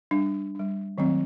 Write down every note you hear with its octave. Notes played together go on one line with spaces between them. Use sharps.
G3 D4
G3 D4
D#3 F#3 A3 C4